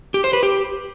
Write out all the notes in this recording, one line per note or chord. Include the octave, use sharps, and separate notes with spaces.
G4
C5
B4
G4